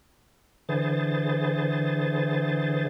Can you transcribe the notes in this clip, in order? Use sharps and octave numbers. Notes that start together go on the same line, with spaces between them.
D3 E3 G#4 C5 A6